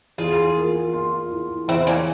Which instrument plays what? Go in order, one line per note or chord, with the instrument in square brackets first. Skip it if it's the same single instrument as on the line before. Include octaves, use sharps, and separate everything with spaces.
[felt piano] E2 [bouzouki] F4 G#4
[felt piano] A#3
F4
E3
[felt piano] E2 [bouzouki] C4 E4
[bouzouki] A#3 C#4